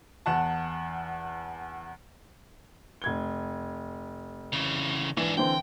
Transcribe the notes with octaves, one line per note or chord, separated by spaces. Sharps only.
E2 F#5 A5
F1 G#6 G7
C#3 E3
G#2 E3 D4
D3 E3 C4 G5